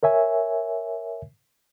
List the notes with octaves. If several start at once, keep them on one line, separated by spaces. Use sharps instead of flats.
A#4 C#5 E5 G#5